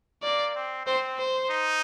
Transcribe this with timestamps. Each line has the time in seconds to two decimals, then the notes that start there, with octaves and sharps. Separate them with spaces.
0.23 A#3 D5
0.55 C4
0.86 C4 C5
1.18 C5
1.50 D#4